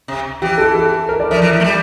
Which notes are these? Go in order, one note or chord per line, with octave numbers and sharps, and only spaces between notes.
C3
E3 G4
A4
A4
A#4
D5
F3 E5
E3
F3
A3
G3